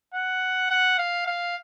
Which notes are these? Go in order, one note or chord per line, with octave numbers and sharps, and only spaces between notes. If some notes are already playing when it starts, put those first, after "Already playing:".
F#5
F#5
F5
F5